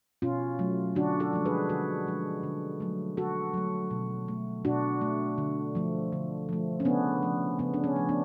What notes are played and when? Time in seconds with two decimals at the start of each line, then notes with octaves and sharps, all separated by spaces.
0.22 B2 C#4 F4
0.59 F#3 A3
0.96 D3 D4 F#4
1.20 F#4 A4
1.33 F3 G#3
1.45 G#4 B4
1.69 D3 F#4 A4
2.07 F3 G#3
2.43 D3
2.80 F#3 A3
3.17 D3 F#4 A4
3.54 F#3 A3
3.91 B2
4.28 A3
4.65 B2 D4 F#4
5.01 A3
5.38 D3
5.75 F3 A3
6.12 D3
6.49 F3 A3
6.80 C#4
6.85 C#3 B3 D4
7.23 F3 A3
7.59 C#3 B3
7.74 D4
7.84 C#4
7.96 F3 A3
8.09 B3 D4